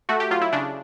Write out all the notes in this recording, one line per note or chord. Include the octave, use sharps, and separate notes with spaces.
A3 F#4
G4
F#3 F4
E4
C#3 D4